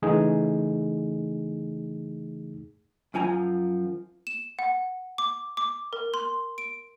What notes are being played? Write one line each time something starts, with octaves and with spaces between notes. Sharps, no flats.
C#3 E3 A3 D#4 G#4
F#2 F3 G#5 A#5
E7
F#5
D6
D6
A#4
C6
D7